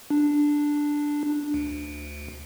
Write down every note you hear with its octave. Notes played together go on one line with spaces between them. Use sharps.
D4
D2